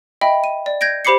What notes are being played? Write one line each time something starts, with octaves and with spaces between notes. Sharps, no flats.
D#5 E5 G5 B5
D#7
D5
G6 G#6 A#6 D7
G4 C5 B5 D6 C7 C#7